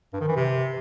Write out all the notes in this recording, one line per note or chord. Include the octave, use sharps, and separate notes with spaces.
G2
D#3
E3
C3